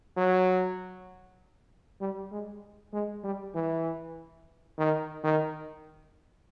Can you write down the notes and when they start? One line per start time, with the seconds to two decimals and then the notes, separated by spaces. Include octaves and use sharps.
0.17 F#3
2.01 G3
2.32 G#3
2.93 G#3
3.24 G3
3.55 E3
4.78 D#3
5.24 D#3